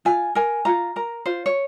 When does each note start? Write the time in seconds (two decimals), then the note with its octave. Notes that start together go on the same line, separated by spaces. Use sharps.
0.05 F4 G#5
0.35 A#4 G#5
0.65 F4 A#5
0.96 A#4 A#5
1.26 F4 C5
1.46 C#5